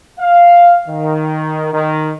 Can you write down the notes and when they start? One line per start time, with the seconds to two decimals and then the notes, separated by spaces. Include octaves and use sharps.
0.19 F5
0.88 D#3
1.73 D#3